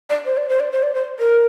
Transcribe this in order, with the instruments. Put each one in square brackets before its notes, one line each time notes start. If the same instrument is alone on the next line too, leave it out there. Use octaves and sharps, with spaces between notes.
[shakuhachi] D5
C5
D5
C5
D5
C5
D5
C5
A#4